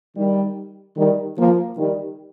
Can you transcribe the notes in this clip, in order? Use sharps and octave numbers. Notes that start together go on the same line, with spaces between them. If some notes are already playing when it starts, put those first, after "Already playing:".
D#3 G3
D#3 G3
F3 A#3
D#3 G3